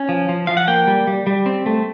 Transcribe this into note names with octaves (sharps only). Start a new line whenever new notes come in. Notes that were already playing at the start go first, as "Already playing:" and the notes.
Already playing: C#4
F3
F3
F3 F5
F#5
A#3 G5
G3
G3
G3
C4
A3